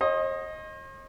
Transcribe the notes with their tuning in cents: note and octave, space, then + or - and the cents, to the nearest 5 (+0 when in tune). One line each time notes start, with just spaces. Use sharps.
C5 +45 D#5 +0